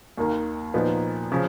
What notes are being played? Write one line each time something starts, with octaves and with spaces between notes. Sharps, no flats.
D#2 D#3 A#3
A#2 F3 B3 D#4
C#3 F3